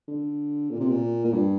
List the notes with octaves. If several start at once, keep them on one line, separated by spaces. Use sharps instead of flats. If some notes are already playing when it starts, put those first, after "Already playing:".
D3
A#2
C3
A#2
A#2
G2